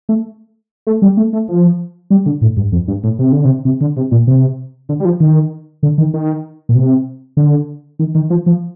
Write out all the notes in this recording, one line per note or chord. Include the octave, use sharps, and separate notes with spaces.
A3
A3
G3
A3
A3
F3
G3
D3
A2
G2
F2
G2
A2
C3
D3
C3
C3
D3
C3
A#2
C3
D3
G3
F3
D#3
D3
D#3
D#3
A#2
C3
D3
D#3
D#3
F3
F3